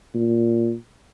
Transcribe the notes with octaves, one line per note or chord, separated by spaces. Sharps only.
A#2